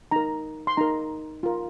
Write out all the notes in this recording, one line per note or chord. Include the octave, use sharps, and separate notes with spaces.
D#4 A#4 A#5
C6
D#4 A#4 A#5
F4 A#4